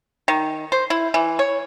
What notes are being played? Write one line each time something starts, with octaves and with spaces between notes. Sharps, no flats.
D#3
C5
E4
E3
C#5